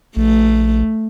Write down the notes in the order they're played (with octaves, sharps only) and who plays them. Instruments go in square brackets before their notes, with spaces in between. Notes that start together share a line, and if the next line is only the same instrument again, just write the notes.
[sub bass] A#1 [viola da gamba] A3